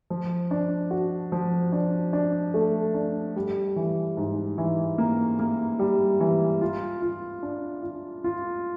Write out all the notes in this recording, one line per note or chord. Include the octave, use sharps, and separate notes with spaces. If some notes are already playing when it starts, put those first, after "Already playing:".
F3
D4
F#4
F3
D4
D4
A3
D4
G3
E3
G#2
E3
A#3
A#3
G3
E3
F4
F4
D4
F4
F4